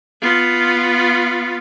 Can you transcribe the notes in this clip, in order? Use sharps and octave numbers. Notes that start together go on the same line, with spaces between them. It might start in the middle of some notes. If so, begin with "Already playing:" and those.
B3 F4